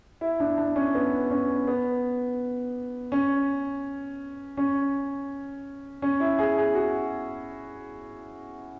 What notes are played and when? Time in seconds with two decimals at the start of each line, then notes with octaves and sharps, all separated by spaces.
0.21 E4
0.40 D4
0.58 D4
0.76 C#4
0.95 B3
1.30 C#4
1.67 B3
3.12 C#4
4.57 C#4
6.02 C#4
6.20 E4
6.38 G#4
6.57 G#4
6.75 F#4